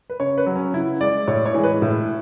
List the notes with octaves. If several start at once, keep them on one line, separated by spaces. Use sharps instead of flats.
B4
C#3 C#5
B4
F#3
C#4
C#3 E4
G#3 D5
A2 C#5
C#5
E3 G#3
B4
A2